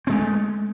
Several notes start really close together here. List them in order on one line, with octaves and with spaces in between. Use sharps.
C4 G#3 A3